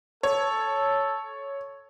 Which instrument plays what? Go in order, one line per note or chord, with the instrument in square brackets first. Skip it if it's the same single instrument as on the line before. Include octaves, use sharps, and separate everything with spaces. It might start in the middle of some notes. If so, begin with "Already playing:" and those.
[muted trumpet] A4 [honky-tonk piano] C#5